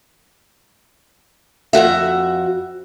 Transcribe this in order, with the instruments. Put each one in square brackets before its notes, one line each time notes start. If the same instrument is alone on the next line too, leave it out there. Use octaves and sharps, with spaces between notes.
[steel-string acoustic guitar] F2 D#3 F#4 E5